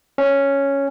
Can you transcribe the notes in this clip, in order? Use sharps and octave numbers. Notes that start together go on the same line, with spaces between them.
C#4